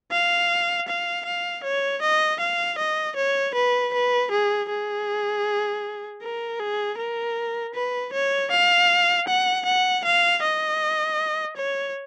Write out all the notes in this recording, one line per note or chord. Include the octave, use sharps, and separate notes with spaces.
F5
F5
F5
C#5
D#5
F5
D#5
C#5
B4
B4
G#4
G#4
A#4
G#4
A#4
B4
C#5
F5
F#5
F#5
F5
D#5
C#5